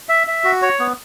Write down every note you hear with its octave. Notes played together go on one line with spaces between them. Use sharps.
E5
E5
F#4
C#5
B3